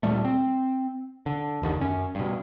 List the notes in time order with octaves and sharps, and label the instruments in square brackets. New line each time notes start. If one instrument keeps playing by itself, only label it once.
[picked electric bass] D1 A#2 G3 A3
C4
D3
F#1 D#2 D3 D#3
F#2 C#4
G2 B2